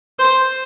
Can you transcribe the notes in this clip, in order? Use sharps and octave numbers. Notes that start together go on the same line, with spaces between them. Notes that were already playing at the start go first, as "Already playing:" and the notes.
C5